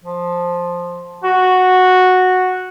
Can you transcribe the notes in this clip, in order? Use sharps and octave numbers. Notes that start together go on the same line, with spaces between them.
F3
F#4